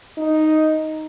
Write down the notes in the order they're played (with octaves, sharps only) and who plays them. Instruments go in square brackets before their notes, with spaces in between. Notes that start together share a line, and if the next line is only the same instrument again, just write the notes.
[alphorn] D#4